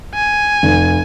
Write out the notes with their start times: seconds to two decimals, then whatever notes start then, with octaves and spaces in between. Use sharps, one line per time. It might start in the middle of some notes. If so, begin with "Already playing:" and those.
0.14 G#5
0.63 F1